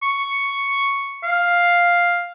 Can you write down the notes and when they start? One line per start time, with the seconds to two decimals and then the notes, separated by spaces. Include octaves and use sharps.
0.03 C#6
1.23 F5